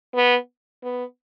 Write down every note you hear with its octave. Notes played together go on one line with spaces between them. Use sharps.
B3
B3